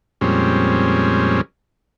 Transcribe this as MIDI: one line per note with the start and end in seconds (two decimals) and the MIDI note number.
0.21 1.41 41
0.21 1.41 46
0.21 1.41 55
0.21 1.41 56
0.21 1.41 60
0.21 1.41 61